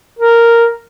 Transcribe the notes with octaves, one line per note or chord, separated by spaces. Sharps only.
A#4